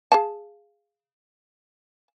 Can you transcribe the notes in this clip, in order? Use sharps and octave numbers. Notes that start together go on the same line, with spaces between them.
G#4 F5 A5